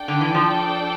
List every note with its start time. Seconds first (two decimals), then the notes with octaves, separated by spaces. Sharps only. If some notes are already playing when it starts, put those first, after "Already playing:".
Already playing: D4 A4 D5 G5
0.08 D3
0.21 E3
0.34 F3